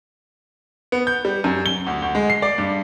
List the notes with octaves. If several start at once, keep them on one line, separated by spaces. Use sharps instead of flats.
B3
G6
G3
F#2
G7
D2
D2
G#3
C7
D5
G2